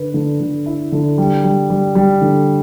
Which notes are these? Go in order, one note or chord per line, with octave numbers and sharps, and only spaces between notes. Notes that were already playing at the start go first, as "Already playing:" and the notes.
Already playing: D3 B4
D3
D3
E4
D3
G3
G3
G3
G3
D3